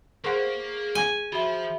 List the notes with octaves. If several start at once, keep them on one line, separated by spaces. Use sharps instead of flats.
A#3 G#4 A#4 C5 F#5
G#5
F3 F#4 E5